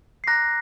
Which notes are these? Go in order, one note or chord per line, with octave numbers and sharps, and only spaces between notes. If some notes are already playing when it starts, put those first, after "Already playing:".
C7
A#5 D6 F#6 A#6